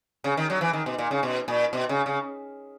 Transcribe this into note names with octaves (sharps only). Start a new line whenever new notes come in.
C#3
D#3
F#3
E3
D#3
B2
A#2
C#3
B2
A#2
B2
C#3
C#3